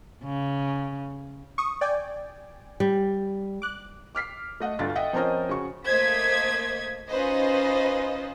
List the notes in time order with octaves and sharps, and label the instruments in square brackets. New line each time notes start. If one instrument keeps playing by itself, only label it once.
[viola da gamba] C#3
[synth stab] C#6 D#6
D5 G5 G#5
[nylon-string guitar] G3
[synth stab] D6 F#6
[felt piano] D6 F6 B6 C7
A3 D#5 F#5
D2 G2 F4 A6
D#5 E5 F#5 G5
F3 C4 C#4 A#4 C5 D#5
C#3 F#4 C#6
[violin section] A3 A#3 C5 D#5 G#6 B6
C#4 D#4 F4 B4 C5 D#5